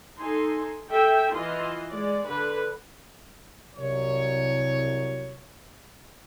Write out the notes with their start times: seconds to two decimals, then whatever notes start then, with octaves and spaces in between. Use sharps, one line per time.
0.18 D#4 A4 G#5 C6
0.88 A4 E5 G5
1.32 E3 F4 D#5 C6
1.91 G#3 D5
2.27 D3 B4
3.76 C2 F#3 C#5